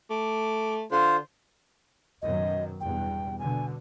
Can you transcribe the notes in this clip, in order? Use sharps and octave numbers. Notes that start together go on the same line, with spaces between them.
A3 D6
D3 F4 C5
F#2 B2 D#3 D#5
E2 G2 B2 G5
B2 D3 G#5